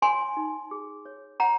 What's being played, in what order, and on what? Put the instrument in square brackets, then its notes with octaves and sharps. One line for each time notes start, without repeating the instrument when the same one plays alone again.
[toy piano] C#5 G#5 C6
D#4
G#4
C#5
C#5 F#5 A#5